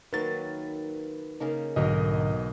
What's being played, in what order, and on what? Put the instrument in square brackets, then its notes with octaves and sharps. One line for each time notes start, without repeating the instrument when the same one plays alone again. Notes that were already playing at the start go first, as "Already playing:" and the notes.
[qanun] D#3 F#3 A#3 [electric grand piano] B4 A6
[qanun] C#3 A#3 D#4
[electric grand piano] B1 B2 D#5 [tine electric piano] G#2 D3 [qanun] D#4 A#4 A#5